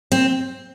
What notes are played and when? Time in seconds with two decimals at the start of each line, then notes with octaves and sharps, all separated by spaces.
0.12 C4